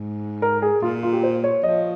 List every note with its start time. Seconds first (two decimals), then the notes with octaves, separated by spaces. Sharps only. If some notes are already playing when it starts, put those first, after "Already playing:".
Already playing: G#2
0.42 A#4
0.62 G#4
0.82 A#2 F4
1.03 F4
1.13 G4
1.23 C5
1.44 C#5
1.63 F3 D#5